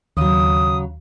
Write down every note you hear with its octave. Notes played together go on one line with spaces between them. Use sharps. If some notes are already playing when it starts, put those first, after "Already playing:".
D#2 C#3 F#3 D#6